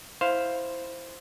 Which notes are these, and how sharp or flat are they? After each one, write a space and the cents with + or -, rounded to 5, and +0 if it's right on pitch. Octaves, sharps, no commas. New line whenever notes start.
E4 +0 C5 +0 F5 +0